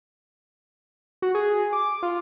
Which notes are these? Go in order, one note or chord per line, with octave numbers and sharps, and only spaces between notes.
F#4
G#4
D6
F4